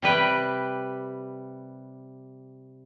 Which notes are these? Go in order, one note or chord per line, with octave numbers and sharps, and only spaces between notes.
C3 G3 B4 G5